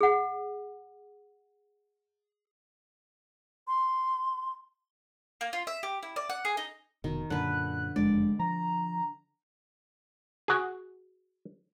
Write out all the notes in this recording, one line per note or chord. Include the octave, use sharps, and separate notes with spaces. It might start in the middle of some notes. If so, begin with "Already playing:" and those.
G#4 F#5
C6
A#3
F4
E5
G4
E4
D5
F#5
G#4
D#4
F1 B2 D#3
F#2 A#2 D3 B4 F#6
F#1 F2 G#3 D4 D5
F3 A#5
F#4 G#4